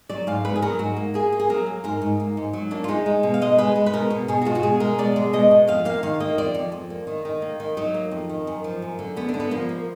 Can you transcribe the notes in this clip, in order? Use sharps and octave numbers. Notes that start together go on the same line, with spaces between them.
F#3 D5
G#2 F5
F#3 B4
G#4
F#3 A#4
G#2 F#4
A#3
A#3 G#4
A#3
G#4
F#3 A#4
A#3
G#2 A#4
G#2
A#3
G#2
F#3
A#3 D4
F4
G#3 D#4
G#3
B2
F5
G#3 D#5
G#3 B4
G#3
B4
B2 A#4
B2
B2 G#4
F#4
G#3 F4
F#4
B2 G#4
G#3 A#4
B2 D5
G#3
B2 D#5
B2
F2 F5
A#3 F5
D#3 F5
A#3 D#5
F2 D5
F2
F2
A#3
D#3
D#3
A#3
D#3
F#3 D#4
A#3
F2
D#3
F#2
F3
F#2
D3
D3 B3
D4
D3
B3
F3 A#3
A#3